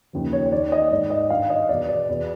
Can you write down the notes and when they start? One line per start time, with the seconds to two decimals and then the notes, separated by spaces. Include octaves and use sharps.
0.13 D#2 C#3 F3
0.33 C#5
0.46 C#5
0.52 D#2 D#3 D5
0.72 D#5
0.91 G#2 D#3 D5
1.10 D#5
1.30 G2 D#3 F5
1.50 D#5
1.69 E2 B2 D5
1.89 D5
2.09 E2 B2